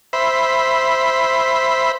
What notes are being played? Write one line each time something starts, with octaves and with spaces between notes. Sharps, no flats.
C5 E5 B5